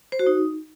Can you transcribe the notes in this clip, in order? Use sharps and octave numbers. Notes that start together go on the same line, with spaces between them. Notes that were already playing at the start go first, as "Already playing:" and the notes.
C5
F#4
D#4